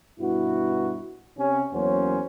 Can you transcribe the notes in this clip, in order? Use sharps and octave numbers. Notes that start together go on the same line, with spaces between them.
G2 B2 E4 F#4
C3 C#4
E2 F#3 A#3 C#4 F#4 C5